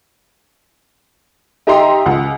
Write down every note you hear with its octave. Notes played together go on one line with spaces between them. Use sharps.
D#4 G4 E5 G5 A#5 C6
C#2 F#5